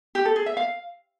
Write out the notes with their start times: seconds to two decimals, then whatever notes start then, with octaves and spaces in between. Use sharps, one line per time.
0.15 G4
0.25 A4
0.36 G#4
0.46 E5
0.57 F5